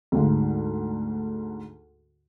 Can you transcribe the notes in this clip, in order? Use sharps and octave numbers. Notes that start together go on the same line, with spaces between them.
D2 G#2